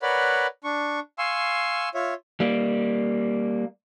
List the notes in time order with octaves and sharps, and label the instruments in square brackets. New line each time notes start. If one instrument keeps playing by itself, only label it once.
[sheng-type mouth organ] A#4 B4 C#5 D5 F#5 B5
D4 C#6
F5 G#5 C6 C#6 E6
F4 C#5 E5
[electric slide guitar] G3 A#3